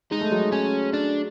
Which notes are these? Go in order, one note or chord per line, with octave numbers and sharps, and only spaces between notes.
G#3 D#4
A3
F#3 G#3
C#4
D4